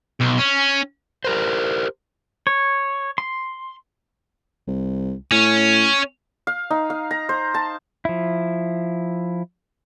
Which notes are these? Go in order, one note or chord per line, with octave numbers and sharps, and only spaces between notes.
B1
C#4
G4 A#4 C5
C#5
C6
C2
A2 C#4
F5
D#4
F5
A#5
C5
A5
F3 E4